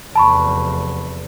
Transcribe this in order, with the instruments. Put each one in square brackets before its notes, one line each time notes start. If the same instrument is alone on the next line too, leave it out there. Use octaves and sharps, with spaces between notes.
[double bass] F1 E2 [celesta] A5 B5 C#6